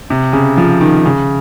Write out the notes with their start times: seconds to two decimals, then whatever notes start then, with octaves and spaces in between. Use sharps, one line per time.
0.10 C3
0.33 C#3
0.57 F3
0.81 D#3
1.06 C#3